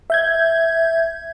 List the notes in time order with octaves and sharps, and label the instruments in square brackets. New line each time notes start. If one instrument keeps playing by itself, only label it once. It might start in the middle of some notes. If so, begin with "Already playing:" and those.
[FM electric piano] E5 G6 G#6